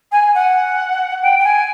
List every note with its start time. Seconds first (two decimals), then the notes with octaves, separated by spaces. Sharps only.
0.11 G#5
0.34 F#5
1.21 G5
1.39 G5
1.43 G#5